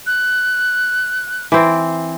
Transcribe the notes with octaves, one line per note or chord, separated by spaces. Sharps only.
F#6
E3 C4